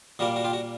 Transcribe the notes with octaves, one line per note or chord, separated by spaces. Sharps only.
A#2 G3 A#3 F#4
F#4
F4 G4
F#4